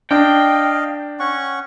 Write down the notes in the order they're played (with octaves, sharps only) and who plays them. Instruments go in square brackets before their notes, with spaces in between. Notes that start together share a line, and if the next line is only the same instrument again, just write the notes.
[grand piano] D4 [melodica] D#5 F5 [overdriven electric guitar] G5
[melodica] C#4 F#5 C#6